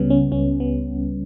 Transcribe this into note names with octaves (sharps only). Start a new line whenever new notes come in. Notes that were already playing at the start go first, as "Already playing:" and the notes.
Already playing: C#2 C#3 G3 B3 C#4
C#4
C#2 C#4
B3